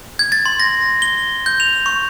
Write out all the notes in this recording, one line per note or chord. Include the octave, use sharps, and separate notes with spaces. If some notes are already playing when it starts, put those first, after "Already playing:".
G#6
A6
C6
A#6
G7
G6
F7
C#6